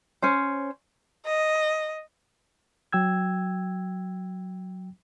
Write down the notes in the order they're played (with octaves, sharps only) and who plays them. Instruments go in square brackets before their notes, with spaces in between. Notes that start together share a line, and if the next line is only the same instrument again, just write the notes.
[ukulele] C#4 C5
[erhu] D#5
[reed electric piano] F#3 G5 E6 G#6